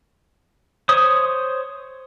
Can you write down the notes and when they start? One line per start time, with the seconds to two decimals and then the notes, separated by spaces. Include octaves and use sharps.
0.89 C5 C#5 D#6